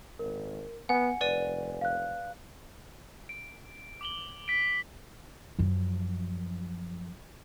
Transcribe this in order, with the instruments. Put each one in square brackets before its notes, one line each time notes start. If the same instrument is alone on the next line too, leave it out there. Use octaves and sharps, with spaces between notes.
[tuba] G#1 [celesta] A#4
[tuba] B3 [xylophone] F#5 [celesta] G#5
[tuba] F1 [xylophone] B4 D5 D#7
[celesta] F5 F#6
[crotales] D7
D6 F#7 G7
B6 D7
[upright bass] F#2 F3